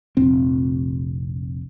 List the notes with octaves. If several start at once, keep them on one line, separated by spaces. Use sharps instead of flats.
F1 A#1 C4